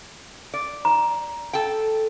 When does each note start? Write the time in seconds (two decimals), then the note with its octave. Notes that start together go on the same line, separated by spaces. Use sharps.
0.54 D5
0.85 A#5
1.53 A4 G5